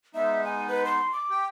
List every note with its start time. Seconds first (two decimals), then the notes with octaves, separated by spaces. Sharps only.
0.15 G#3 B3 D#4 E5
0.44 G#5
0.68 B4
0.85 C6
1.12 D6
1.30 G4 G5